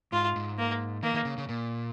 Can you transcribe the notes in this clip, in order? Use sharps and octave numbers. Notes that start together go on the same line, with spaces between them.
G#2 F4
G#2
A#3
D#3 A#3
D#3
C#3
C#3
A#2